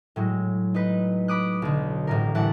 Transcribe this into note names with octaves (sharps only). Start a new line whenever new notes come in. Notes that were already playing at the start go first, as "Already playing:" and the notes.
A2 F#3 G#3
D#4 B4
B5 D6 D#6 F#6
B1 D3
A1 A2 A#4
A1 E3 G3 F#5 A5